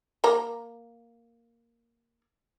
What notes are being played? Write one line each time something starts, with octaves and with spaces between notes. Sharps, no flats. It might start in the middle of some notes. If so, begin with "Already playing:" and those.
A#3 A#5